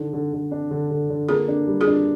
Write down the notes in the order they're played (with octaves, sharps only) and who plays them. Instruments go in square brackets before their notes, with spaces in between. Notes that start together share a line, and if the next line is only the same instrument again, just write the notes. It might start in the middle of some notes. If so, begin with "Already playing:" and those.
Already playing: [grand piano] D3 D4 [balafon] D#4
[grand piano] D3
D3
D4
D3
D3
D3
[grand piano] A#3 [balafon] F4 G#4
[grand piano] D4
G3
[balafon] F4 G#4
[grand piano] D4